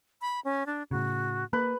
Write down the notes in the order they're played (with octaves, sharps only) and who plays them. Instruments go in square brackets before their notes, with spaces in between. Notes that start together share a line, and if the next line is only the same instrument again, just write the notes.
[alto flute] B5
C#4
D4
[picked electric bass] A2 C#3 [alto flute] F#4
[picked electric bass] A#3 [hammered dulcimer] B4